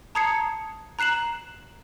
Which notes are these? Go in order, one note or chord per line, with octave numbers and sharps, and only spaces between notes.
A5 A#5 D#6 G#6 C7 C#7
A#5 F#6 C7 E7 F#7